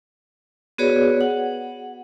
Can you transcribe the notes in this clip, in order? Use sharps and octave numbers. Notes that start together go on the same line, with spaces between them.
B3 F#4 G#4 B4 C#5 D5
F#5